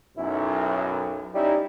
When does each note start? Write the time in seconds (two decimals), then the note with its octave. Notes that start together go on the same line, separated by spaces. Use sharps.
0.17 B1 F#2 E4
1.34 G3 C#4 D#4 E4